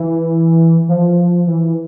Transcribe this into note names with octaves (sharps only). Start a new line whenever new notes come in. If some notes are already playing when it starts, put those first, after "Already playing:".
Already playing: E3
F3
E3